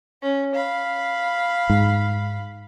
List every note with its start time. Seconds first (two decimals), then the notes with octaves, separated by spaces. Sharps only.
0.22 C#4
0.55 F5 B5
1.70 G#2